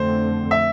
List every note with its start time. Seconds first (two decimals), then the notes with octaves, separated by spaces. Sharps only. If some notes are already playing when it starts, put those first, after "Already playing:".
Already playing: F2 D3 A3 C4 C5
0.51 E5